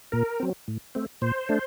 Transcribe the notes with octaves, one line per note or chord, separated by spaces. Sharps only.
A#2 A#4
F#3 C4
A2
A3 C4
A#2 C5
A3 D4